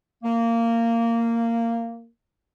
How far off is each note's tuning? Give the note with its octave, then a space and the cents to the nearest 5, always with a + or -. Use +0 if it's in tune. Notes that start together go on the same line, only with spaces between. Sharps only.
A#3 -15